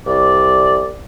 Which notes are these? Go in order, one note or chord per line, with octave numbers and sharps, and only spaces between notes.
C2 D5